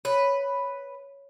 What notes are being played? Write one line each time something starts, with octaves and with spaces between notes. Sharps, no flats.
B4 C#5